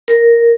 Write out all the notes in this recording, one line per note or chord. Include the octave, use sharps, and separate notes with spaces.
A#4